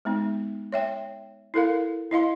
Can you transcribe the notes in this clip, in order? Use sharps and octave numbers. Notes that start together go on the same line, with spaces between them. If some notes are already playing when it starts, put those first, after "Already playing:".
G#3 B3 D#4
C#5 E5 G5
E4 A4 A#4 F5
E4 D#5 F5 C6